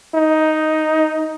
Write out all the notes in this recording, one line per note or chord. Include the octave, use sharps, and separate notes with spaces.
D#4